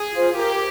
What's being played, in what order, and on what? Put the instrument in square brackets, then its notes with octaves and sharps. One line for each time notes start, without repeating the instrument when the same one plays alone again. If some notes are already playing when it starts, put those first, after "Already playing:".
Already playing: [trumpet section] G#4
[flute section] F4 C5
[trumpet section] G4 [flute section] A#4